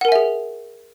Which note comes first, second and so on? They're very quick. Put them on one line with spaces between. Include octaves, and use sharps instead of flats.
F#5 A#4 G#5 E5 G#4